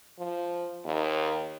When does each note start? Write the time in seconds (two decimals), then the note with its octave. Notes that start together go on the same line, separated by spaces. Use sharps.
0.19 F3
0.85 D#2